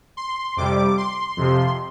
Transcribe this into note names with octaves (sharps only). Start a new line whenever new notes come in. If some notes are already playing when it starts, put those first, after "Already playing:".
C6
F2 C3 G3 D6
C6
F2 C3 F3